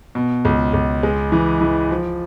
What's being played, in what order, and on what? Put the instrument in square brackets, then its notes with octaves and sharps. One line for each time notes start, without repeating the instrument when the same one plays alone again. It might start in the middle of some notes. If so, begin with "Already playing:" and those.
[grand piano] B2
C#2
C#2
G#3
E3
E3
F3